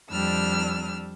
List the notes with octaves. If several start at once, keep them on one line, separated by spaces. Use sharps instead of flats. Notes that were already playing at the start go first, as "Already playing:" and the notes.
F2 G3 D4 E6 F6